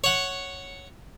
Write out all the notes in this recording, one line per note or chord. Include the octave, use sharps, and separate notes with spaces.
C#5 F#5